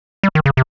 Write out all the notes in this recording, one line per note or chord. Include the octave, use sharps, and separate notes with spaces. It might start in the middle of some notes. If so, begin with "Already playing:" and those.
G3
D#3
C#3
C3